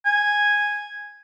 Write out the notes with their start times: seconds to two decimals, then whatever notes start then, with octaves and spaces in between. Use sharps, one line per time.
0.06 G#5